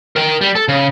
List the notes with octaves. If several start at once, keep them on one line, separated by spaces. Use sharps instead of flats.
A#4 G5
G3
A4
C#3